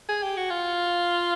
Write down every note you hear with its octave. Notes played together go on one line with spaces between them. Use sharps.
G#4
G4
F#4
F4